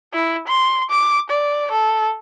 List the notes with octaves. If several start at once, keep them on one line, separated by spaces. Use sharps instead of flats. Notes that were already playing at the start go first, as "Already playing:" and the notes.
E4
C6
D6
D5
A4